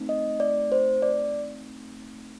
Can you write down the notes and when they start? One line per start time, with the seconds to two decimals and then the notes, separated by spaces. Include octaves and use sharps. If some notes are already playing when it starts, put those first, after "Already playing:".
Already playing: A3 C4 D#4
0.09 D#5
0.40 D5
0.72 C5
1.02 D5